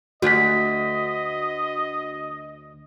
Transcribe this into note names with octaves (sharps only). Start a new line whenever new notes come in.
D2 F#4 D#5 B6